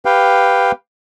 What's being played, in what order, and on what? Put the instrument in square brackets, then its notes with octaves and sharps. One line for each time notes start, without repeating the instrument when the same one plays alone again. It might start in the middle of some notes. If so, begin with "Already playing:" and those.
[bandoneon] G4 B4 F5 G5